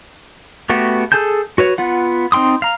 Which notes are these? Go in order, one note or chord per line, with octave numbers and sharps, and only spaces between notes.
A3 B3 F#4 G4
G#4 A4 G#5 A5 G6
F#4 B4 C#5
B3 F4 F#5
C4 D#4 G5 C6 D#6
F5 A#5